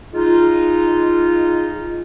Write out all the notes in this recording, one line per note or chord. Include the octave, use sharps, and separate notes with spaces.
G#3 D#4 F4